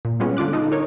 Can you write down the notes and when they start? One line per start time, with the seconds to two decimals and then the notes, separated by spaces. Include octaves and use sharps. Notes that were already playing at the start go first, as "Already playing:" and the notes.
0.05 A#2
0.20 G3 G#3 B3 C#4 F4
0.37 D3 F4 D6 F#6
0.53 D#4 F4 A4 D#5
0.72 D#4 A#4 C#5